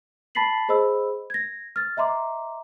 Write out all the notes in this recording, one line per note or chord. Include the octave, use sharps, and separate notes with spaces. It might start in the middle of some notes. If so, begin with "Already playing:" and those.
A5 B5 A6 B6 C7 F#7
G#4 C5 D#5 B5 E6
G#6 A#6
F6 A6
D#5 E5 A#5 C6 D6